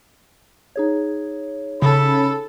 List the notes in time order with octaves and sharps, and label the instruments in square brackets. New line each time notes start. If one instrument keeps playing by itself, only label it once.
[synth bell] D#4 G#4 C#5
[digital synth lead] C#3 [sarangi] A4 [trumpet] B5